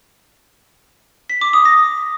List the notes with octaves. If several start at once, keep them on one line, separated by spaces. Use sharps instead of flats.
B6
D6
D#6
A#6